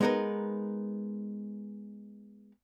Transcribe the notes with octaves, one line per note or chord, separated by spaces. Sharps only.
G#3 B3 D#4 A#4 B4